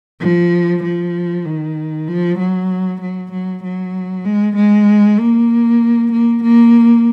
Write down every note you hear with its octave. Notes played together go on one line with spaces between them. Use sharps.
F3
F3
D#3
F3
F#3
F#3
F#3
F#3
G#3
G#3
A#3
A#3
A#3